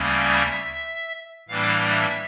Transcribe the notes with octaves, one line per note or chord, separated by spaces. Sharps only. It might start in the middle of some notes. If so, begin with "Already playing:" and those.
Already playing: D2 C#3 G3 A#3 C#4
E5
A2 E3 G3 A#3 D4 F5
E5